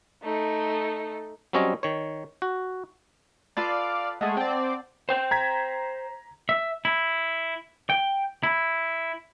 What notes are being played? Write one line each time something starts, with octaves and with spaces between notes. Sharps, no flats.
A3 D#4
F#3 G3 C4 C#4 C#5 D#5
D#3 C#5
F#4
F4 A4 B4 D5 F5
G#3 A3 G#4 F#5 A5
C4 D5
C5 G5
A#5 G#6 B6
E5
E4
G5
E4